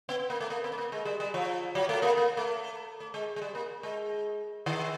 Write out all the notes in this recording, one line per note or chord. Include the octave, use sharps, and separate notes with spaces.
B3
B3
A#3
A3
A#3
B3
A3
A#3
G#3
G3
G3
F3
F#3
A3
A#3
A#3
A3
A3
G#3
G#3
G3
A#3
G#3
D#3